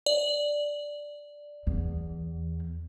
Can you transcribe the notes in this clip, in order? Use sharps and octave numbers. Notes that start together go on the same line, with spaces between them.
D5
E2